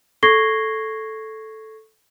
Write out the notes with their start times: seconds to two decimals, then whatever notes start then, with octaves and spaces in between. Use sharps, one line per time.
0.23 A4 C#6 G#6 A#6 C7 G7